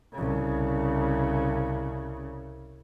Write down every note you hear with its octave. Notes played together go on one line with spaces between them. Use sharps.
C2 C#3